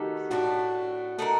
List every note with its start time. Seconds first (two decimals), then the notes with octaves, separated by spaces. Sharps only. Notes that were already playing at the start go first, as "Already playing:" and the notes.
Already playing: D#3 A3 D#4 F#4 G4 A4
0.30 A2 A3 D4 F#4
1.19 A3 D#4 F#4 A#4